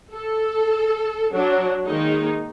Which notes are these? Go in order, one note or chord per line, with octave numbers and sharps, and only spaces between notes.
A4
F#3 D4
D#3 G#3 A#3 D#4